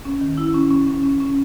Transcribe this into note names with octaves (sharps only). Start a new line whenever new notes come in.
C#4
D#3
E4
C#4
C#4
C#4
C#4
C#4